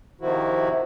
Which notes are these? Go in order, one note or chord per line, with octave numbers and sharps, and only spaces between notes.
C3 D#3 F3 E4 F#4